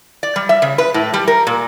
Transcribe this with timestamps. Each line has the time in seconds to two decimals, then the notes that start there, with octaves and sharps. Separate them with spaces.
0.23 D5
0.36 G3
0.49 E5
0.62 C#3
0.78 B4
0.94 A2
1.14 G3
1.28 A#4
1.47 A#2